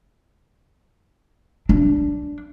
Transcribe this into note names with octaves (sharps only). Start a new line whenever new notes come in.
D4